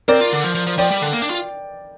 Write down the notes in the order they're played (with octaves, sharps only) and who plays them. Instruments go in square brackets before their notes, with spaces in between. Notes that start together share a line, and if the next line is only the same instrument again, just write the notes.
[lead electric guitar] C4 [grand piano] A#4 D5
[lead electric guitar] F4
D3
F3
F3
F3
[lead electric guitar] F3 [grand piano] D5 G5
[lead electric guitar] G3
D3
A#3
D4
F4